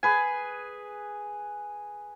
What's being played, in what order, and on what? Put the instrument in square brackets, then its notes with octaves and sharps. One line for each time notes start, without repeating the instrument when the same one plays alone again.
[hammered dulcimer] G#4 B4 G#5